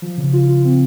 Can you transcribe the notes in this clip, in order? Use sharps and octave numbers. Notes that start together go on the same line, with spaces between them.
F3
C#3
F4
F4
C4